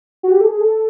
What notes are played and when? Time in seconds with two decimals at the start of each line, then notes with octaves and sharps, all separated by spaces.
0.23 F#4
0.31 G4
0.41 A4
0.47 G#4
0.61 A4